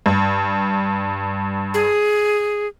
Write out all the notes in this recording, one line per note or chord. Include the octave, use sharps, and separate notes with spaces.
G2
G#4